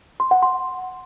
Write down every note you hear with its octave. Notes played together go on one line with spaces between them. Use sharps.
C6
F#5
C6